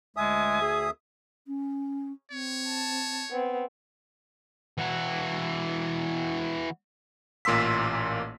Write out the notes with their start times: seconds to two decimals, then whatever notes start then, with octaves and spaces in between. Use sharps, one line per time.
0.16 D2 G#3 E5 G#5 D#6
0.62 G#4
1.47 C#4
2.32 C4 C#5
2.67 A5
3.31 B3 C4
4.78 E3 F#4
7.45 A1 A#2 A#3 C6 E6 B6